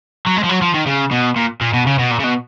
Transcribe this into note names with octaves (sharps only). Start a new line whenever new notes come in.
F#3
G#3
F3
F#3
F3
D#3
C#3
B2
A#2
A#2
B2
C#3
B2
A#2
C#3
B2